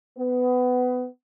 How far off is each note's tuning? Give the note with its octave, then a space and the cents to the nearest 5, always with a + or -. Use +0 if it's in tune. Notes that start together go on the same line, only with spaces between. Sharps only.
B3 +20